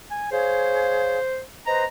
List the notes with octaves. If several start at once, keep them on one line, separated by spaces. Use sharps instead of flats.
G#5
G#4 C5 C#5 F5
B4 C5 D#5 A#5